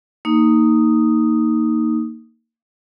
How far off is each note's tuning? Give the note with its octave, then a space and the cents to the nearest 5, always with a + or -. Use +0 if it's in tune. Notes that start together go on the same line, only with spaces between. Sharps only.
A#3 -15 D#4 +0 D#6 +0